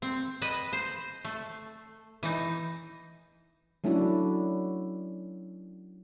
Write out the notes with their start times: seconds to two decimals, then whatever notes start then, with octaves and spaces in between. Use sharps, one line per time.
0.02 C4
0.42 B4 D#5
0.73 C5
1.25 A3
2.23 E3 D#4
3.84 F#3 A3 C#4 D4 E4 F#4